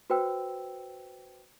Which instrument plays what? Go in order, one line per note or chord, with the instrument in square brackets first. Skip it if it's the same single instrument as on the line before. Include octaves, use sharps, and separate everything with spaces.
[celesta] F#4 B4 C5 G5 E6